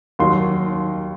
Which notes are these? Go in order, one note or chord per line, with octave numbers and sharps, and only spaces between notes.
D#2 D#3 F#3 C6